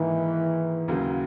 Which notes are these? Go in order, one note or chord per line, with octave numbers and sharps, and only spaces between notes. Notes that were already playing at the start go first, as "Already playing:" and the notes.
Already playing: G#2 D#3 E3 A#3 D#4
D#2 C#3 F#3 A#3